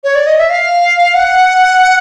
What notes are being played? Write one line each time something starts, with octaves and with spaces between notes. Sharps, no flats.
C#5
D5
D#5
E5
F5
F#5